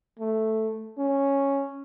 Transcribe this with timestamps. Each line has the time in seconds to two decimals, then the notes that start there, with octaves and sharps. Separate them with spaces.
0.19 A3
0.98 C#4